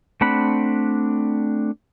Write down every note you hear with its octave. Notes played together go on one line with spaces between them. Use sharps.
A3 C4 D4 F#5 B5